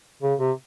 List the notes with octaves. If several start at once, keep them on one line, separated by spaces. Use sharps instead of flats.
C#3
C3